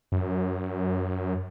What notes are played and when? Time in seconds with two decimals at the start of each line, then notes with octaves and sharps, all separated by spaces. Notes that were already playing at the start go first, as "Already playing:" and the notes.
0.12 F#2